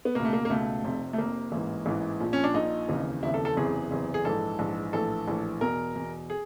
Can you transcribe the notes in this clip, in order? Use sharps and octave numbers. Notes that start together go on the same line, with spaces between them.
B3
C#2 B2 A#3
A3
A#3
A#3
C#2 B2 A3
F1 F2 C3
A3
F1 F2 C3 A#3
A1 G#2 E3
A1 G#2 E3
A#1 A#2 F3
C#4
D4
A#1 A#2 F3 D#4
F1 D#2 C#3 E3
F1 D#2 C#3 E3 E4
A4
A4
F#1 E2 C3 E3 G#4
F#1 E2 C3 E3
G#4
A#1 G#2 E3 A4
A#1 G#2 E3
A#1 A2 E3 A4
A#1 A2 E3
E2 B2 A#4
E2 B2
G#4